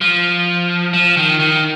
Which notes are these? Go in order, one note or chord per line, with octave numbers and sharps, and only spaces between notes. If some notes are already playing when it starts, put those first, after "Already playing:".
F3
F3
D#3
D#3